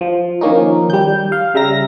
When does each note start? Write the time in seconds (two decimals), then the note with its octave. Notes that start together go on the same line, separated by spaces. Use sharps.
0.01 F3
0.41 D#3 F3 A#3 C#4 D#4
0.90 G3 G6
1.32 F5
1.54 C#3 G3 E5 A#5 A#6